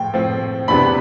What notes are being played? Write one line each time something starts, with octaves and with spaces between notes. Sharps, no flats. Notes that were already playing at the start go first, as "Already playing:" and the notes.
Already playing: A2 F3 G5
A2 F3 C4
E2 C3 E3 B3 D4 B5